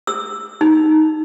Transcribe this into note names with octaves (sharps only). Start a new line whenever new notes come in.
E6
D#4